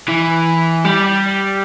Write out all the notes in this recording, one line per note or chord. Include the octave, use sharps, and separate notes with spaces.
E3
G3